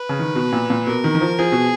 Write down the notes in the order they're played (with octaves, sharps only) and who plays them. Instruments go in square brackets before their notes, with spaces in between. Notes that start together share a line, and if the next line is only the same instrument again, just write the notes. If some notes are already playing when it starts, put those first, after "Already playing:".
Already playing: [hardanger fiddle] B4
[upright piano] C#3
D#3
B2
A#2
A#2
[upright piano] B2 [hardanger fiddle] A#4
[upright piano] D#3
D#3
F3
[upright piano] F3 [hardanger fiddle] G#4
[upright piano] B2